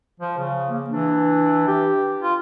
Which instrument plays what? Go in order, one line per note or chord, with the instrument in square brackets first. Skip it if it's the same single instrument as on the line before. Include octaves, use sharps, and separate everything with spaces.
[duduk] F3
C#3
[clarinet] A#3
[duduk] E3 [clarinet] D4
[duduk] G4
F4